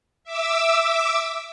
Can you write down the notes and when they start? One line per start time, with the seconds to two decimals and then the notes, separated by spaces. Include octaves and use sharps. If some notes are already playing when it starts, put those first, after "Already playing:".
0.24 E5 D6 E6